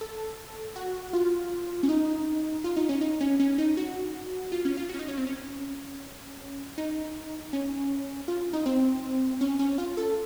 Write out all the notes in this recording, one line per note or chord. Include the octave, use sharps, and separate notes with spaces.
A4
F#4
F4
C#4
D#4
F4
D#4
C#4
D#4
C#4
C#4
D#4
F#4
F4
C#4
F4
F#4
C#4
D#4
C#4
C4
C#4
D#4
C#4
F4
D#4
C4
C#4
C#4
F4
A4